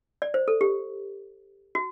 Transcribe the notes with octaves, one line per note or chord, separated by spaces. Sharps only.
D5
C5
A4
G4
F#4